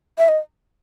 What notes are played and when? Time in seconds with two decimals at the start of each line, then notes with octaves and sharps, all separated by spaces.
0.18 E5
0.28 D#5